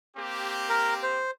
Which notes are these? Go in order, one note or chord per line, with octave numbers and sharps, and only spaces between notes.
A#3 C4 G4
A#4
C5